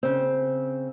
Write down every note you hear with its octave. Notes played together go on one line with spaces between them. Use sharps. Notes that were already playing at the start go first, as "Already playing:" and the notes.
C#3 C4